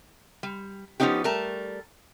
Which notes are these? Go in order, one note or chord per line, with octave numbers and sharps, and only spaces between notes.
G3
F3 A#3 B3 C#4 D#4 G4
G3 A3 A#4 A5